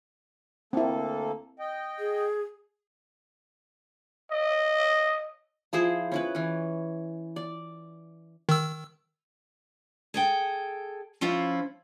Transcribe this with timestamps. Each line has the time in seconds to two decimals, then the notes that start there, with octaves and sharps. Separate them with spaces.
0.73 D2 A#3 C4 E4 A4
1.59 D#5 G5
1.99 G#4
4.31 D#5
5.73 F3 E4 G#4 C5
6.12 C#4 E4 B4
6.35 E3 C#4
7.36 D5
8.49 D#3 E6
10.14 G#4 A4 G5
11.21 F3 C#4 E4 F4 C5